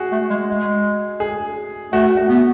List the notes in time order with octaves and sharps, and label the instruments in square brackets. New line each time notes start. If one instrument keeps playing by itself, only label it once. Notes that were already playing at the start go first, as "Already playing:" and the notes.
Already playing: [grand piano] F#4 G#4
[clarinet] A3
G#3
G#3
[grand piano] G#4
[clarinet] A3 [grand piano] F#4
[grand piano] F#4
[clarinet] B3